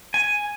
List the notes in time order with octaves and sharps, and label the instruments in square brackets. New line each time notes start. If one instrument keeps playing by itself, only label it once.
[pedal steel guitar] G#5